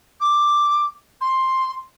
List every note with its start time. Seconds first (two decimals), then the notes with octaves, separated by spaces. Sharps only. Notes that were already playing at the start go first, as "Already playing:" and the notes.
0.20 D6
1.21 C6